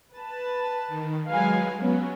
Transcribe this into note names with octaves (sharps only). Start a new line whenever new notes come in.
B4 A5
D#3
F#3 G#3 B4 F5 G#5
F#3 B3 C#4